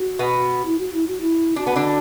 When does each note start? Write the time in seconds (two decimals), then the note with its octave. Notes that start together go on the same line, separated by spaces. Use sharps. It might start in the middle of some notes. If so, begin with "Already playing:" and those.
Already playing: F#4
0.19 B2 B3
0.66 E4
0.78 F#4
0.93 E4
1.07 F#4
1.21 E4
1.56 D4 F#4
1.67 B3
1.76 D3 D4